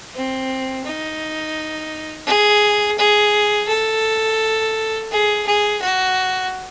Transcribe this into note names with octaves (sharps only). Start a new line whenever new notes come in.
C4
D#4
G#4
G#4
A4
G#4
G#4
F#4